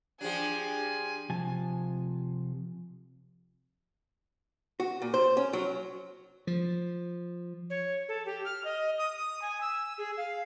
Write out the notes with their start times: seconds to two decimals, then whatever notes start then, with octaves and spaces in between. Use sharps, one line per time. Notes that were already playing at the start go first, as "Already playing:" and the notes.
0.21 F3 D4 G4 G#4 G#5
1.30 C3 F3 G#5 A5
4.80 F#4
5.02 A#2
5.14 C5
5.37 C#4
5.53 F#3
6.47 F3
7.70 C#5
8.09 A4
8.26 G4
8.45 F6
8.65 D#5
8.98 D#6
9.16 D#6
9.42 G#5
9.61 E6
9.98 G#4
10.17 F5